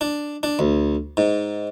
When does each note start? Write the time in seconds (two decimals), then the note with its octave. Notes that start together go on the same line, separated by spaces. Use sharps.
0.01 D4
0.43 D4
0.59 D2
1.17 G#2